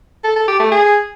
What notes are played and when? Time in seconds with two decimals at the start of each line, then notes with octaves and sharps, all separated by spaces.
0.24 A4
0.36 A4
0.48 G4
0.59 A3
0.71 G#4